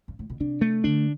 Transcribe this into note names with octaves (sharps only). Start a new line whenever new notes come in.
G2
A2
B2
C3 D4
A3
D3 D4